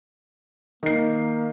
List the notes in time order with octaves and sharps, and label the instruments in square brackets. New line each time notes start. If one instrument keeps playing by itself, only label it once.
[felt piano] D#3 C7 [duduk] A#3